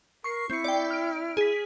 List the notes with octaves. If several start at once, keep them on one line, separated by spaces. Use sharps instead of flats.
A#4 C#6 C7
C4 E4 C#7
D5 G5
F6 D7
G#4 B6